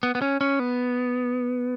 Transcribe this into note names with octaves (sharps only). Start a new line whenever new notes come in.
B3
B3
C#4
C#4
B3